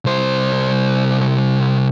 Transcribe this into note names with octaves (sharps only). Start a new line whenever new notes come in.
C2 C5